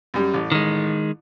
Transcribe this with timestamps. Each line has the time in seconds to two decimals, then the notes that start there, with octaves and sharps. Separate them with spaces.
0.14 F#2 G3
0.34 A1
0.52 D#3 G#3